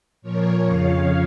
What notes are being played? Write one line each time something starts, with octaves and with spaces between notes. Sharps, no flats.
A#2 F3 A#4 C#5
F2 C#3 F3 C#5 F5